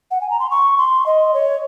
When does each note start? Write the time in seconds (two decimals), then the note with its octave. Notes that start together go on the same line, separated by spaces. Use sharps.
0.11 F#5
0.21 G#5
0.30 A#5
0.40 C6
0.50 C#6
0.78 C6
1.06 D#5
1.34 C#5